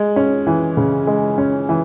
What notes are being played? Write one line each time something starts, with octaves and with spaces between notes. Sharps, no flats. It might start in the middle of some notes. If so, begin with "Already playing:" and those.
Already playing: G#3
C#4
E3
C#3
G#3
C#4
E3